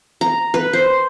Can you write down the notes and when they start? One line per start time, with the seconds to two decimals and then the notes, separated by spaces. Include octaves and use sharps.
0.21 A#5
0.54 B4
0.73 C5